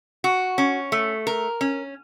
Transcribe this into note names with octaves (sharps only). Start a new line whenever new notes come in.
F#4
C#4
A3
A#4
C#4